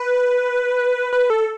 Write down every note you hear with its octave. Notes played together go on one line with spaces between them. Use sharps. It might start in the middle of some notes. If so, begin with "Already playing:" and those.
Already playing: B4
B4
A4